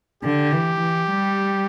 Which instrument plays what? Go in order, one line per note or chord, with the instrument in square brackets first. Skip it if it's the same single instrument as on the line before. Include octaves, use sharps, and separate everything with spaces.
[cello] D3 [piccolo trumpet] G4
[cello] E3
E3
G3